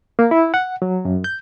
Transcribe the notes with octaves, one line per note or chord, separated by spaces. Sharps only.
A#3
E4
F#5
F#3
F#2
G6